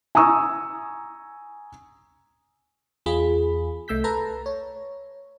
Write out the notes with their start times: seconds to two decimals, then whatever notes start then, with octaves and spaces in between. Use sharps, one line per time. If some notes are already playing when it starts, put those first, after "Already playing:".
0.15 G#5 A#5 C#6 D#6 E6
3.06 E2 F4 G#4 B5
3.88 C2 A3 E6 G6 B6
4.04 A4 B4 A5 A#5
4.46 C#5